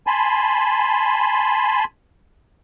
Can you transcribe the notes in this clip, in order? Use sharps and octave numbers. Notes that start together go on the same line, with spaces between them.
G#5 A5 B5 C6